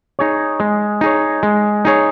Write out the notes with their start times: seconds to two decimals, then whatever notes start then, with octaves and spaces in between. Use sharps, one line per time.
0.19 D#4 G#4 C#5
0.60 G#3
1.01 D#4 G#4 C#5
1.43 G#3
1.85 D#4 G#4 C#5